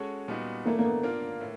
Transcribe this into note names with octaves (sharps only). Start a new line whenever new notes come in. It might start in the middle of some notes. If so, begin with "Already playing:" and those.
Already playing: G#3 C#4 F#4 A4 C#5
A#2 G3 B3 D#4 F#4
E3 A3 A#3 D4
A#3
B3
A#3 D4 F4
A2